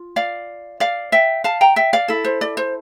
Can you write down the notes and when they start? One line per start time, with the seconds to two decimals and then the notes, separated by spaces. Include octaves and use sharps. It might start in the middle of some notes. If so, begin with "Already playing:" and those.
Already playing: F4
0.16 D5 F5
0.80 D5 F5
1.12 E5 G5
1.44 F5 A5
1.61 G5 A#5
1.76 E5 G5
1.93 D5 F5
2.08 E4 A4
2.24 C5
2.41 D5
2.57 C5